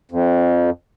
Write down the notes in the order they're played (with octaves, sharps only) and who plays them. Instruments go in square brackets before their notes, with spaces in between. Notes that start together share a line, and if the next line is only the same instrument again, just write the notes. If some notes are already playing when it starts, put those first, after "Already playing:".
[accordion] F2